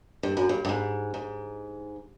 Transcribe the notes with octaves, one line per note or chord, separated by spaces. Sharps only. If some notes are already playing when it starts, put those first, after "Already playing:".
G2
F#2
G2
G2
G#2
G#2